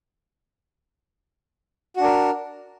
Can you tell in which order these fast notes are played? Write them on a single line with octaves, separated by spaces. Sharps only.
F#4 D4 A#4